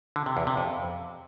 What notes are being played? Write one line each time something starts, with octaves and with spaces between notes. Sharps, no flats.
D3
C3
E2
C3
F2